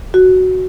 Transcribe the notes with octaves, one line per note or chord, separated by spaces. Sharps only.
F#4